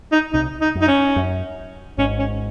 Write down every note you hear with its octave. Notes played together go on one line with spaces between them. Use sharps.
D#4
C2 C3 D#4
D#4
F#2
D#4
C#4
F#2
G#1 G#2 C#4
C#4